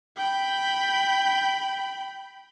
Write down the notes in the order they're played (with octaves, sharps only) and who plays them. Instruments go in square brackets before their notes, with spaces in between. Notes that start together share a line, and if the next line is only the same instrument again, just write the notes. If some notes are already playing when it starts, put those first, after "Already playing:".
[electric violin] G5 B5